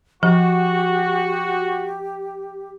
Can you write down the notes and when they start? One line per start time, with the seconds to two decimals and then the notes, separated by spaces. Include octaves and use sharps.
0.23 F3 F#4 G4